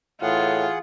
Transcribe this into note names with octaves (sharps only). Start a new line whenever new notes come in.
A2 E3 F4 G#4 F#5